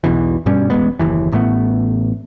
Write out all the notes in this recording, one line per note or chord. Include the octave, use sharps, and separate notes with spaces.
B1 E2 B2 E3
G2 B2 G3 C#4
E1 A1 G#3 B3
F#1 D#2 E3
A1 A2 A3 B3